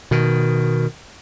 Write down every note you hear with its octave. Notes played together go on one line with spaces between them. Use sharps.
B2 D#3